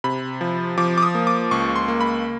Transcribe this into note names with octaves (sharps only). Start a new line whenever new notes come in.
C3 B5
F3
F3 D6
D6
D#6
A#3
D6
C#2 C#6
C6
A#3
B5